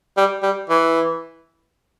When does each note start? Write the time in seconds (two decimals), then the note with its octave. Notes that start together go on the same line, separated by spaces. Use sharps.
0.17 G3
0.43 G3
0.70 E3